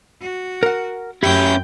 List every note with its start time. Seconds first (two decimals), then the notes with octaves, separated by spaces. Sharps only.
0.21 F#4
0.63 A#4 F#5
1.23 F#2 C#4 E4 G4 G5